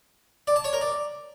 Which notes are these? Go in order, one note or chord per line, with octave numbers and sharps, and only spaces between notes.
D5
A5
C#5
A#4
D5